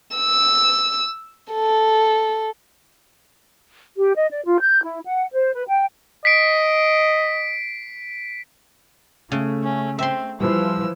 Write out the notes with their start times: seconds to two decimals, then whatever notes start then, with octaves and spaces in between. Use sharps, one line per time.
0.16 E6
1.52 A4
3.97 G4
4.16 D#5
4.31 D5
4.46 F4
4.62 G6
4.84 E4
5.06 F#5
5.33 C5
5.53 B4
5.69 G5
6.25 D#5 B6 C7 D7
9.32 C#3 A3
9.63 C#4
9.99 C4 E5 C6
10.41 E3 F3 G3 E6